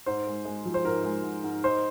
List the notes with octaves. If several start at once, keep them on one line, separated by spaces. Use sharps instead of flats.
G#2 C5
G#3
G#3
F3
C5
G#2 A#4
G#3
G#2
G#2
D#4 C5